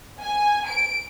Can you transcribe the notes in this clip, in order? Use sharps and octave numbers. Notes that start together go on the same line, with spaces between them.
G#5
D7